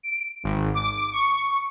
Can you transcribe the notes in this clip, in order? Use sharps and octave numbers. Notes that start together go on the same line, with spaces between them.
D7
G#1
D6
C#6